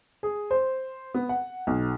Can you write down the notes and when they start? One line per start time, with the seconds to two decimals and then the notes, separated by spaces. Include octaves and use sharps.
0.23 G#4
0.51 C5
1.14 B3
1.29 F#5
1.67 B1